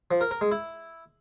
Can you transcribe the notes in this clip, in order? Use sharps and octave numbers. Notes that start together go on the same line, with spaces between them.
F3
A#4
A#4
G#3
E4